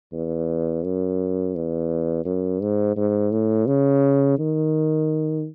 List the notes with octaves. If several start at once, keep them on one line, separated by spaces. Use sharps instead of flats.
E2
F#2
E2
F#2
G#2
G#2
A2
C#3
D#3